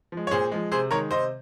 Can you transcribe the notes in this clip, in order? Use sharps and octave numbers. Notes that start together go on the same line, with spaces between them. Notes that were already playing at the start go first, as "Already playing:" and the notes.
F3 G#3
C#5
A#2 G#4 C5
F3 G#3
C3 G#4 C5
D#3 G#3 A#4 C#5
C3 C5 D#5